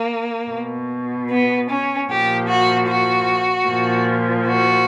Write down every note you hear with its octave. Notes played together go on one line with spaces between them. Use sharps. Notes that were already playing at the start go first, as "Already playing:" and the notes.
Already playing: A#3
B2
B3
C#4
A#2 F3 G4
F#4
F#4
A#2 F3
F#4